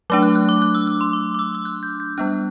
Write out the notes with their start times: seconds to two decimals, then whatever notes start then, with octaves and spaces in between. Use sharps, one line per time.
0.10 F#3 A3 D4 D6
0.22 F#6
0.35 F#6
0.49 D6
0.62 F#6
0.75 E6
0.87 E6
1.01 C6
1.13 D6
1.34 D6
1.39 E6
1.55 E6
1.65 F#6
1.83 G6
2.00 G6
2.18 G3 B3 D4 F#6